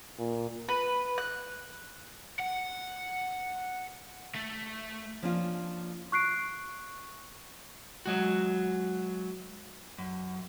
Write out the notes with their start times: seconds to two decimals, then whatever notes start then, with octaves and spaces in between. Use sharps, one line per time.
0.18 A#2
0.69 B4
1.18 F#6
2.40 F#5
4.36 A3
5.22 F3 A#3 C#4 D4 F4
6.12 C#6 F#6 C7 D7
8.06 F#3 G#3 F#4
9.98 F#2